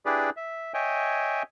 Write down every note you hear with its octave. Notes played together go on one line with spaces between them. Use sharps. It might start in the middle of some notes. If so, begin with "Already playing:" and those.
D4 E4 G4 G#4 B4 D5
E5
C#5 D#5 E5 G5 G#5